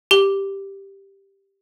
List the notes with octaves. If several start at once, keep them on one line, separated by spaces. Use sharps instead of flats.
G4 G7